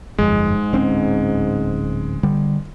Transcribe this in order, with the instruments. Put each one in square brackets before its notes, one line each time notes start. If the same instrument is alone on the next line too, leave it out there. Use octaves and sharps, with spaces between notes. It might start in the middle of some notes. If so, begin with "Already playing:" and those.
[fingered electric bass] G1 F2 [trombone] G#2 [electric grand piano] G#3
[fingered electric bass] D1 C4 C#4
D3 G3